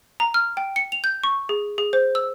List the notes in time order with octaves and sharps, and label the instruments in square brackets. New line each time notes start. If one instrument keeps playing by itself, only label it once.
[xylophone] A#5
F6
G5
C#7
F7
G6
C#6
G#4
G#4
C5
E6